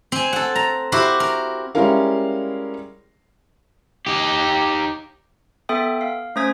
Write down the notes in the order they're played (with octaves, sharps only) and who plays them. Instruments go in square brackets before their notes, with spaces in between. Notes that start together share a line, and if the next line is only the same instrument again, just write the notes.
[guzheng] C4 G#5
A4 F#5
A#5
E4 F#4 G4 C5
A#4
[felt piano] G3 G#3 C#4 E4 A#4 F5
[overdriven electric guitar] D#4 G4
[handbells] B3 A4 E5 G5 D#6
F5
A3 C#4 C5 D#6 G#6 B6